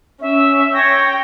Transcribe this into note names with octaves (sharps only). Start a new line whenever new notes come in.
C#4 E5
C#5 G5 A#6